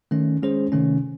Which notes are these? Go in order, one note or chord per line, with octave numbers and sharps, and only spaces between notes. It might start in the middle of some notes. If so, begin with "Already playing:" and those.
D#3 A3 C#4
G#3 C#4 G#4 C5
C3 D#3 A3 C#4